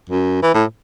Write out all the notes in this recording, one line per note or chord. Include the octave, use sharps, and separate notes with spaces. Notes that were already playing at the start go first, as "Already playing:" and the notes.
F#2
E3
A2